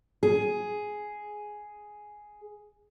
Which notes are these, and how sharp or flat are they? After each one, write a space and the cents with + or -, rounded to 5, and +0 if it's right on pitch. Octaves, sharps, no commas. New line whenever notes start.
G#4 +5